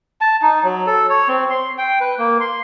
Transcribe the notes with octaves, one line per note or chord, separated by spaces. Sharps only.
A5
D#4
F#3
A4
C#5
C4
C6
G5
B4
A#3
C6